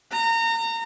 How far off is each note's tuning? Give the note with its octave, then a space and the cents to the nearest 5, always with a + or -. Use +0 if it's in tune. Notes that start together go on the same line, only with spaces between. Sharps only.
A#5 -30